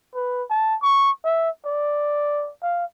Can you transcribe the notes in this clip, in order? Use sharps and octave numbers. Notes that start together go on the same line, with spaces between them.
B4
A5
C#6
E5
D5
F5